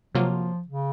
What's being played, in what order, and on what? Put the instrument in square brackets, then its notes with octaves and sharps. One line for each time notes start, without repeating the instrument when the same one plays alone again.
[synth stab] C3 F#3 A#3 F4 [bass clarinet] F3
[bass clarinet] C#3